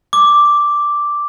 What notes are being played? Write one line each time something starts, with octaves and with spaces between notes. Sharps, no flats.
D6